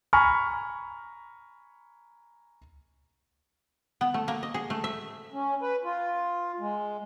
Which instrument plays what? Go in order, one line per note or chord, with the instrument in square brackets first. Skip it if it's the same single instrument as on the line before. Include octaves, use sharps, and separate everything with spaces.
[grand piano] G#5 A#5 B5 C#6 F6
[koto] B3
A3
A#3
D#5
G#4
A3
E5
[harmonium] C#4
B4
F4
G#3